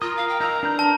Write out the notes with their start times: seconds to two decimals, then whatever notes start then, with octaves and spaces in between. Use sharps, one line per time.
0.02 F4 A#4 D#6
0.17 F5
0.28 G5
0.40 D#4 A#5 E6 F6
0.63 D4 B4 G6
0.79 A#4 A5